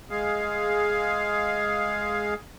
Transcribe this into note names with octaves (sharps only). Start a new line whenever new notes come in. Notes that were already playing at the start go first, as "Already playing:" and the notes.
G#3 G#4 F5